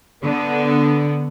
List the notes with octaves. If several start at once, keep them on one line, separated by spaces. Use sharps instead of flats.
D3 B3